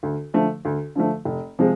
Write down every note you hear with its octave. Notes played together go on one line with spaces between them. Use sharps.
D2
D3 F3 A3
D2
D3 F3 A3
F1
C3 F3 G#3